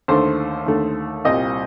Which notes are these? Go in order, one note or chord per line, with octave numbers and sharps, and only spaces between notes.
D#2 D3 A3 C5
D#2 D3 A3
C2 A#2 G3 C4 D#5